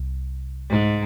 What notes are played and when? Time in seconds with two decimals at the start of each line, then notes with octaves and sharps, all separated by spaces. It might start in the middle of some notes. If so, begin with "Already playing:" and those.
Already playing: C2
0.70 G#2